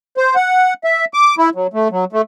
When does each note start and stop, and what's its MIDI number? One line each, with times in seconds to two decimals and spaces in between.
0.17 0.35 72
0.36 0.74 78
0.84 1.05 76
1.14 1.35 86
1.38 1.50 64
1.55 1.67 54
1.74 1.88 57
1.91 2.05 54
2.13 2.21 57